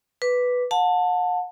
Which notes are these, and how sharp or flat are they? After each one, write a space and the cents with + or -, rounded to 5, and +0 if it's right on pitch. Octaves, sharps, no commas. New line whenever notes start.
B4 +0 D6 -10
F#5 -40 A5 +10